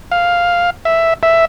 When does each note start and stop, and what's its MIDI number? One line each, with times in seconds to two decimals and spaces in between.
0.12 0.70 77
0.85 1.14 76
1.23 1.45 76